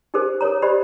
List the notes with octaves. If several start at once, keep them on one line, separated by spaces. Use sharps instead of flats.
D#4 G4 G#4 A#4 C5
A4 A#4 C#5 A#5
G4 C5 D5 D#5 B5